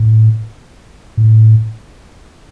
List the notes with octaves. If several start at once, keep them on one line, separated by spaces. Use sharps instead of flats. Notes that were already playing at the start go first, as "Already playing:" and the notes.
Already playing: A2
A2